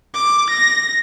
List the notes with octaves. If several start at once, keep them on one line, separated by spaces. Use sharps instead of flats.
D6
A#6